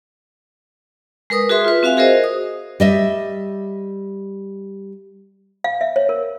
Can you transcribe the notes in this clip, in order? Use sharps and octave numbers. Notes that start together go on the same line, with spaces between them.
G#3 A#4 B4 D#6
F#4 G#4 B4 E5 C6
F4 B4
C4 F#4 E5 F5 G#5
F#4 G#4 A#4 C5 D#5
D#6
G3 D#5 E5
F5
E5
C#5
A#4